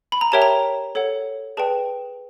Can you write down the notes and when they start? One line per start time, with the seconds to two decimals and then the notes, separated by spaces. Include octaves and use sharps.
0.12 B5
0.21 A#5
0.32 G4 A#4 C#5 E5 G5 A5
0.42 A#5
0.95 A4 C#5 F#5
1.57 G#4 B4 D5 G5 A5